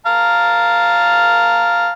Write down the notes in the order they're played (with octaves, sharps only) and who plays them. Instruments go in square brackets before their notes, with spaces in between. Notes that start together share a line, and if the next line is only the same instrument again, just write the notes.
[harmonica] F5 A5 A#5